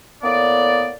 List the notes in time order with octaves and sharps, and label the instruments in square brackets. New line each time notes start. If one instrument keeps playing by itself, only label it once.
[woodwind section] A2 A#3 B3 D5